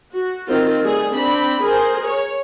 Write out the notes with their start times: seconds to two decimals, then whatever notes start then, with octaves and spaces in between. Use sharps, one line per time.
0.11 F#4
0.49 D#3 C4 F4
0.84 G3 A3 G#4
1.13 C4 D4 B5
1.61 G#4 A#4 C5
2.06 C#5